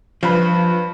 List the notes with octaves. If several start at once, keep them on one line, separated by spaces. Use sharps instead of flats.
G2 F3 B4 B5